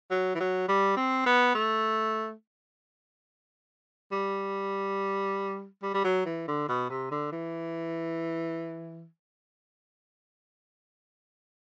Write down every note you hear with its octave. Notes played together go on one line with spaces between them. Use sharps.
F#3
E3
F#3
G3
C4
B3
A3
G3
G3
G3
F#3
E3
D3
B2
C3
D3
E3